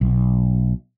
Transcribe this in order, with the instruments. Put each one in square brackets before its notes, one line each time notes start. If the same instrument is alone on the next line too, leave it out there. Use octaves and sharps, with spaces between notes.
[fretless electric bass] B1